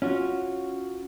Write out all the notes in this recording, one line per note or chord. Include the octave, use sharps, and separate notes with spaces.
C#4 F4 F#4